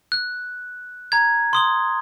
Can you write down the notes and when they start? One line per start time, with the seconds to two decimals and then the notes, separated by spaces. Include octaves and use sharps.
0.12 F#6
1.12 A#5 G#6
1.53 C6 D#6 G7